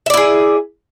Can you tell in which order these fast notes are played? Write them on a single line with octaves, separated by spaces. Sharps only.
E5 D5 E4 G#4